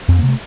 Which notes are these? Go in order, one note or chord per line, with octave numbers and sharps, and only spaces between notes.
F2 C4
C3 A#3
A3